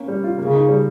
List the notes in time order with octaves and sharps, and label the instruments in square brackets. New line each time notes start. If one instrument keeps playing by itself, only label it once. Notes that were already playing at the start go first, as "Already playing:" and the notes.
Already playing: [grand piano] A#3 C#4
G3
F4
[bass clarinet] C#3 [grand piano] A#3
[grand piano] D#4
G3